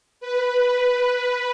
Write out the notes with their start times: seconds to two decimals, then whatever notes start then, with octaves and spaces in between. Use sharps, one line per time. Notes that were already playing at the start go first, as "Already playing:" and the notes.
0.20 B4